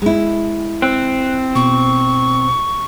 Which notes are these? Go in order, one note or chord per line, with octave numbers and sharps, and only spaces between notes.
G#3 E4
C4 F#6
B2 C#6